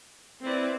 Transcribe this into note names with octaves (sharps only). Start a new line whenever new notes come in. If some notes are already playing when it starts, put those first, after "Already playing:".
C4 E4 B4 D5